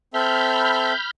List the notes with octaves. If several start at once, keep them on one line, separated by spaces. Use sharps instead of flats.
C4 A4 E5 B5 F6 G6